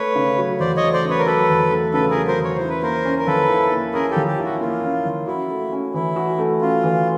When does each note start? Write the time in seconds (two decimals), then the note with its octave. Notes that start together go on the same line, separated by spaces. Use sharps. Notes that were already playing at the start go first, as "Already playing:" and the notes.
Already playing: A3 B4 C#5
0.15 C#3
0.38 F#3
0.60 E2 C5 D5
0.77 C#5 D#5
0.83 A3
0.93 C5 D5
1.05 C#3
1.10 B4 C#5
1.19 A#4
1.26 F#3 A4 B4
1.50 E2
1.71 A3
1.94 C#3 A4 B4
2.10 G#4 A#4
2.16 F#3
2.27 A#4 C5
2.38 E2
2.44 C#5
2.56 E4 C5
2.69 B4
2.83 A#3 A#4 C5
3.05 C#4
3.19 A#4
3.27 F3 A4 B4
3.49 E4
3.72 A#3
3.93 C#4 G#4 A#4
4.10 G4 A4
4.16 F3
4.28 G4
4.39 E4
4.44 F#4
4.61 A#3 F4
4.83 C#4
5.05 F3
5.27 E4 F#4
5.50 A3
5.72 C#4
5.94 E3 E4
6.16 F#4
6.38 A3
6.61 C#4 F4
6.83 E3